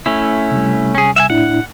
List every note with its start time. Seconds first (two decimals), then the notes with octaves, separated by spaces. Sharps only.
0.06 A3 C#4 E4
0.51 C3 G3
0.95 C#4 G#4
1.16 E5 F5 G#5
1.30 A2 D4 E4 F#5